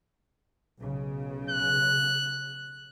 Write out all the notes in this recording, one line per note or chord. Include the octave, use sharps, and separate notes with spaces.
B1 C#3
F#6